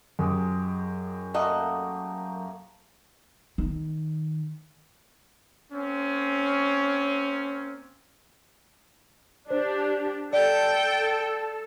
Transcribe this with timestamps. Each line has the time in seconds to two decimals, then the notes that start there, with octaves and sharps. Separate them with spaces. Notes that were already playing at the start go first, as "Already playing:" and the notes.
0.19 F#2 G#3 G4
1.34 A3 A#3 F#4 D#5
3.58 D#3
5.72 A#3 C4 C#4
9.50 D4 G4 C5
10.33 A4 D5 G5